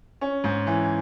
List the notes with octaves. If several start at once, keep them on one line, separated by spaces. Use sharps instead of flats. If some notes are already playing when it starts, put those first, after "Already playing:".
C#4
G#2
E3